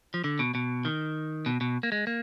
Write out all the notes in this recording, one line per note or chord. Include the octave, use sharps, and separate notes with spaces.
F3
D3
B2
B2
D#3
B2
B2
A#3
G#3
A#3